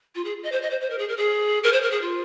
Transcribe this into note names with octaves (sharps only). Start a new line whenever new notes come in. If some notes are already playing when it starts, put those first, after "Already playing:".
F4
G#4
D#5
C5
D#5
C5
C5
A#4
G#4
A#4
G#4
A#4
C5
A#4
G#4
F4